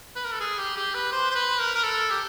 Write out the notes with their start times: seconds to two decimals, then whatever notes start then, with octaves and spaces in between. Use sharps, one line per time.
0.16 B4
0.25 A#4
0.33 A4
0.40 G#4
0.59 G4
0.76 G4
0.95 B4
1.12 C5
1.31 C5
1.35 B4
1.60 A#4
1.75 A#4
1.83 A4
2.11 G4